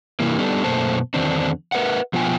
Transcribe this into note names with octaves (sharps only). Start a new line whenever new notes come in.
C3 E3 G3 A#3
G3 B3 D4 D#4 G4 A4
F#2 B2 A3 A#3 C5 A5
E2 D3 D#3 C4 D4
A#4 B4 E5 F#5
B2 F3 B3 F4 G5 G#5